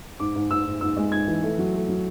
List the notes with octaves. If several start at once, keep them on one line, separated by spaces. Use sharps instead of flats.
G#2 D6
G#2
G#2 E6
G#2
G#2 E6
G#3
G#2 G#6
E3
A3
F#3
A3
F#3